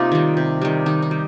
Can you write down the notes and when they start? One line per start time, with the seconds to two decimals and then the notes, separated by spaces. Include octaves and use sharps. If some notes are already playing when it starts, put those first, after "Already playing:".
Already playing: C3 A#3 D#4 F4 G4
0.12 D#3 G3
0.37 C3
0.62 D#3 G3
0.86 D#3 D#4
1.02 D#4
1.11 G3